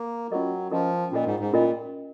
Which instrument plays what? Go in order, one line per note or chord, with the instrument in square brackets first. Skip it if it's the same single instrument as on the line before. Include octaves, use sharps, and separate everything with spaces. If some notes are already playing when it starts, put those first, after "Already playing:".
Already playing: [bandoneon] A#3
[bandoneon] F#3 [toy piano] C#4 F4 A#4 D#5
[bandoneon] F3 [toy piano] C#4 F4 A#4 D#5
[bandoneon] A#2 [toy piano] C#4 F4 A#4 D#5
[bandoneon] G#2
G#2
[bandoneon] A#2 [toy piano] C#4 F4 A#4 D#5